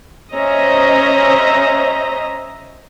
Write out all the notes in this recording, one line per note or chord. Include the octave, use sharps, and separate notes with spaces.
C#4 C5 D#5 E5 A#5